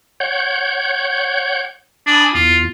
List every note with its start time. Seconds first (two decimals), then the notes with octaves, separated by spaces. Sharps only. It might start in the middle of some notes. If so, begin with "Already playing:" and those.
0.20 C#5 F#5 G6
2.07 D4 G#5 B5 D#6
2.35 E2 F4